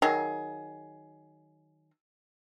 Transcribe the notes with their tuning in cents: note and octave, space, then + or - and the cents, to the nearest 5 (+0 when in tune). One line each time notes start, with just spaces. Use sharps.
D#3 +0 F#3 +10 G#4 +15